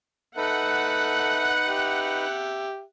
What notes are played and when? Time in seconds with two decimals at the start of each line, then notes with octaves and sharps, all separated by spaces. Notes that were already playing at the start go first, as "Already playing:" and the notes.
0.37 D#4 A4 B4 E5 F#5
1.68 G4 E5